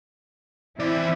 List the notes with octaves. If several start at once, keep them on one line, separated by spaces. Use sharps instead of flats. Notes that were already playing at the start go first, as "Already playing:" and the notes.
E3 C4 E4 D5